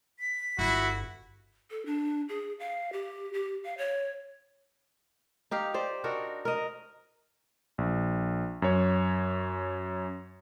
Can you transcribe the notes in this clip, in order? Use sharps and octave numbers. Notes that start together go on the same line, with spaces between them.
B6
G1 G2 E4 F#4
A4
D4
G#4
F5
G4
G4
F5
C#5
D#4 G4 F5
G4 C5 D5
D4 D#4 F#4 A#4
A#4 D#5
A#1
F#2 C#5